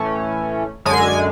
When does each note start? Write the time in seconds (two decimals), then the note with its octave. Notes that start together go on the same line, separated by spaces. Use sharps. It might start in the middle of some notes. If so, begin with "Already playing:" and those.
Already playing: A2 E3 A3 C#4
0.85 F#2 D3 G#3 G#5